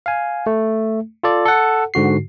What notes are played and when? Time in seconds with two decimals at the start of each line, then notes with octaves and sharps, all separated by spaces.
0.06 F5 G#5
0.47 A3
1.23 F4 A4 D5
1.45 A4 F#5
1.94 G#2 D3 F#4 C7